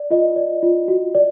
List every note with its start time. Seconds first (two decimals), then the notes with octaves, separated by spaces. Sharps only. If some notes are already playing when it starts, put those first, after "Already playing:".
Already playing: D5
0.11 F4 D#5
0.36 D5
0.63 F4
0.88 F#4
1.15 D5